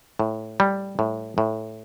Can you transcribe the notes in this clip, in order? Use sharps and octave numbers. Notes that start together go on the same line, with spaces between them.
A2
G3
A2
A2